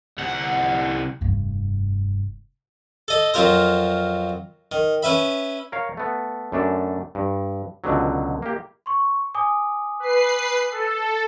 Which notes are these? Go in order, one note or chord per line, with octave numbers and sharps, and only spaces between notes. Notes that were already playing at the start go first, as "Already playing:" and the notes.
C2 F#5
F1 G2
A4 D#5
F2 F#3 F4 A#4 C5
D#3
C#4 B4 E5 B5
A#4 C#5 F5
A3 B3
F#2 A3 D4
G2
C#2 B2 D3 F#3
A#3 G4
C6 C#6
G#5 D6 D#6
B4 C7
A4